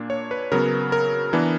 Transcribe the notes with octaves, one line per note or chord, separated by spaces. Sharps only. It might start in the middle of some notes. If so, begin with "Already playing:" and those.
Already playing: A#2 A#3 D4
C#5
B4
C#3 F#3 B3 A#4
A#4
E3 B3 D4